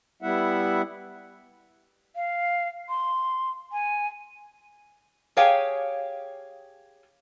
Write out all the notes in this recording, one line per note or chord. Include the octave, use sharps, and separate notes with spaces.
G3 B3 E4 E5 F#5
F5
C6
G#5
G4 G#4 C#5 F5 G5 G#5